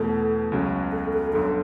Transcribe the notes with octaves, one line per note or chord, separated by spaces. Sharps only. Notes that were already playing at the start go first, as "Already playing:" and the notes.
Already playing: E2 B2 A3 A4
C#2 C#3 F#3 C#4
A4
A4
G1 F#2 D3 A4